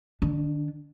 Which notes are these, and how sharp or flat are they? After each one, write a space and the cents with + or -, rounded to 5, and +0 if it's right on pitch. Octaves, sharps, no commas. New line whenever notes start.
D3 +40 D4 -15